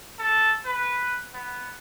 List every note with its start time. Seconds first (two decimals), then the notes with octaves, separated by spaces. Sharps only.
0.19 A4
0.65 B4
1.33 B3